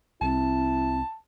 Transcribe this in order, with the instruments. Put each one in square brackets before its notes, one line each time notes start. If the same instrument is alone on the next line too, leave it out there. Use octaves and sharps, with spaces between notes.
[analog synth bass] C2 [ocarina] C4 [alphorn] E4 [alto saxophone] A5